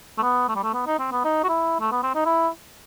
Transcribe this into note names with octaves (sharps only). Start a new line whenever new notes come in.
A3
B3
A3
G3
A3
B3
D#4
C4
B3
D#4
F#4
E4
A3
B3
C4
D#4
E4